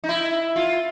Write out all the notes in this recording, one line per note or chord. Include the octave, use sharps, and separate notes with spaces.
D#4
E4
F4